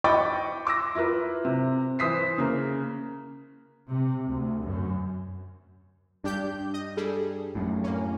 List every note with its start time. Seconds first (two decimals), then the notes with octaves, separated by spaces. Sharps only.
0.04 D#5 G5 B5 C#6 D6 A6
0.65 C6 D6 E6 A#6
0.95 E4 F4 A#4 B4
1.45 C3
1.99 E3 C5 D#6 B6 C7
2.38 C#3 A#3
3.90 C3
4.27 D2
4.65 F#2
6.24 G2 D4 G4 G6
6.74 D#5
6.97 G3 G#4 A4
7.55 F#2 A2
7.84 A#3 C#4